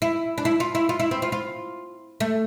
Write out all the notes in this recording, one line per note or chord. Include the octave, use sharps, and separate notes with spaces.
E4
D4
E4
F4
E4
F4
E4
C4
F4
F4
A3